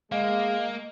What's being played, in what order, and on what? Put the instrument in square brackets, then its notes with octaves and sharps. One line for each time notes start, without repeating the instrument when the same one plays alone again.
[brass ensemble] G#3 [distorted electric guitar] A#3 [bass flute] D#5 [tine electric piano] F5